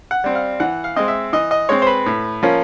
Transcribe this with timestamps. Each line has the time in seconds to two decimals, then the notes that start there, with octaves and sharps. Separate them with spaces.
0.11 F#5
0.24 G3 C4
0.35 F5
0.60 E3 F#5
0.84 F5
0.96 G#3 C4 D#5
1.08 E5
1.33 E3 D#5
1.51 D#5
1.69 G#3 C4 C#5
1.82 C5
1.87 B4
2.06 A2
2.43 F3 A#3 C#4